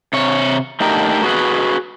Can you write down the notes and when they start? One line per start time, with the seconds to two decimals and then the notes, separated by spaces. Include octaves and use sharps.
0.13 C3 C#5
0.80 A3 D4 D#4 G4 A#4
1.23 F#4 G#4 B4